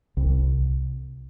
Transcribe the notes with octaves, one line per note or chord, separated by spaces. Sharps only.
C2